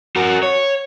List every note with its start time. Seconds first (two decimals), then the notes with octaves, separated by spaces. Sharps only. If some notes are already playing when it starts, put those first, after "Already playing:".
0.16 F#4 A#4
0.43 C#5